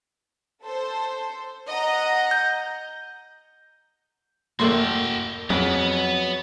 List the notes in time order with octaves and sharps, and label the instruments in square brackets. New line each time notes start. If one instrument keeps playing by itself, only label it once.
[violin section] A4 C5
D#5 F#5 A#5
[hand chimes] G6
[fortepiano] A1 A3 C6 [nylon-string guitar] A#3 [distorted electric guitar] F#4 G5
[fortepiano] F2 [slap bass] F#3 [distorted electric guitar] B3 B4 [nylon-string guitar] G#4